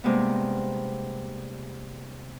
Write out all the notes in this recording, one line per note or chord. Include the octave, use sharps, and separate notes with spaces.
G2 C3 G#3 A#3 B3